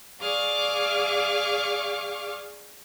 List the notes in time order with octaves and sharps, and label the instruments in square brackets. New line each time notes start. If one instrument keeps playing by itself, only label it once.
[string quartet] G#4 D5 F5 C#6 D6 F6